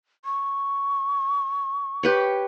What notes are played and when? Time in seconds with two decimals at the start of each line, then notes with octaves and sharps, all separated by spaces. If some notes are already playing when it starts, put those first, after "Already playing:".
0.25 C#6
2.03 G4 B4 C#5